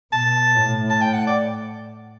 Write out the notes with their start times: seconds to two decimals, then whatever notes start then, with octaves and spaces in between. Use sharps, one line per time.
0.12 B2 A5
0.55 A2
0.90 A5
1.01 G5
1.13 F#5
1.27 D5